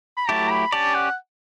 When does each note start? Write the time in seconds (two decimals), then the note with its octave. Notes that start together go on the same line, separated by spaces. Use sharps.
0.17 B5
0.29 F#3 A3 E4 G4 A5
0.51 B5
0.72 C#4 G4 D5 A5
0.95 F#5